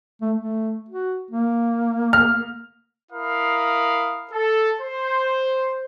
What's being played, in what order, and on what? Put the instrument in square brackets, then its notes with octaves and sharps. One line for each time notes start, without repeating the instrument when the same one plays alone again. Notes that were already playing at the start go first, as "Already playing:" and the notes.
[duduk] A3
A3
F#4
A#3
[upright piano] F6
[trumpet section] E4 A#4 F5 B5 D#6
A4
C5